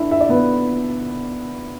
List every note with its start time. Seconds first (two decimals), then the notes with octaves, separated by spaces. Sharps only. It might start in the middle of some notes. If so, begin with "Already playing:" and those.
Already playing: D4 E4 E5
0.11 E5
0.20 D5
0.29 B3 B4